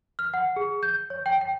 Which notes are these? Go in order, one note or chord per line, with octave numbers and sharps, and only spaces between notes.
F6
F#5
G#4
G6
C#5
G5
G5